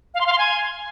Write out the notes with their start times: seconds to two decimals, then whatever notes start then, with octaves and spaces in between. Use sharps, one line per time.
0.14 F5
0.20 C6
0.26 F5
0.32 C6
0.38 G#5